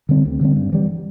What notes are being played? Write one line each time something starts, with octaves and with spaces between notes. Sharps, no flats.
D3 G3 C4
D2
D3 G3 C4
G2
E3 G3